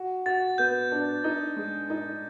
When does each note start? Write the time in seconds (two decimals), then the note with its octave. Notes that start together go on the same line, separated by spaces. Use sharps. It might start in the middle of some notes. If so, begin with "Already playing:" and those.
Already playing: F#4
0.26 F#4 A6
0.58 B3 G6
0.92 D4
1.24 D#4
1.56 G#3
1.90 D#4